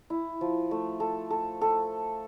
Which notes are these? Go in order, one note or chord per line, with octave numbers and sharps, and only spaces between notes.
E4
F3
A3
A4
A4
A4